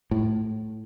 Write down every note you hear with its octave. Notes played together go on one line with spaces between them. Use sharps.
A2